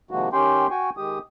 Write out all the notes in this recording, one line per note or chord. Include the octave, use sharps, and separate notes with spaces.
C3 D#3 F3 G#3 A#3 F#4
D#3 C#4 G4 G5 C6
F#4 G5 G#5 C#6
D#3 G#3 G4 D#6